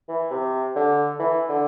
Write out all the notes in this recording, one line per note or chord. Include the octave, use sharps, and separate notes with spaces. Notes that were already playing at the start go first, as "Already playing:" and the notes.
E3
C3
D3
E3
D3